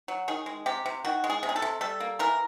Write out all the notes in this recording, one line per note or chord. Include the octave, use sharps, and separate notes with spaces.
F#3
D#3 G#4
G#3
C3 G4
C3
D#3 F#4
G#3
G#4
C3
G#4
A4
C3
G3 A4
A#3
E3 A#4